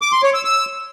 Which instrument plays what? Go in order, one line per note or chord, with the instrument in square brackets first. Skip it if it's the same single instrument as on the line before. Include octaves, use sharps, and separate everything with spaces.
[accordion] D6
C6
C#5
E6
E6